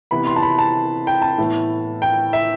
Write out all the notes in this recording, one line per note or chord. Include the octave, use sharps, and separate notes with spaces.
C3 E3 B3 B5
C6
A5
B5
A5
G5
A5
A2 E3 B3
G5
E5